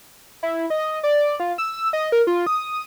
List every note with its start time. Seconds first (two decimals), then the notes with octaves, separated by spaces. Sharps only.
0.43 E4
0.70 D#5
1.03 D5
1.40 F4
1.58 E6
1.93 D#5
2.12 A#4
2.27 F4
2.47 D#6